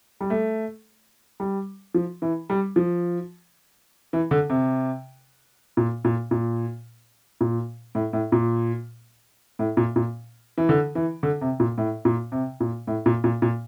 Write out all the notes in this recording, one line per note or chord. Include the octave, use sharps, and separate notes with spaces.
G3
A3
G3
F3
E3
G3
F3
E3
D3
C3
A#2
A#2
A#2
A#2
A2
A2
A#2
A2
A#2
A#2
E3
D3
E3
D3
C3
A#2
A2
A#2
C3
A#2
A2
A#2
A#2
A#2